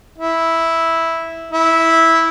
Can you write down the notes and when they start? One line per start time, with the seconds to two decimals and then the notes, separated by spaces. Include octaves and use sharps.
0.18 E4
1.52 E4